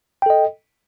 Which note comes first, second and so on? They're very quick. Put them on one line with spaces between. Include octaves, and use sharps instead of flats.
G5 A4 D#5